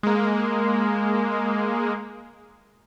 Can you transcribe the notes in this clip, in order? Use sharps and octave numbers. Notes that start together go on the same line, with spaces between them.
G#3 A#3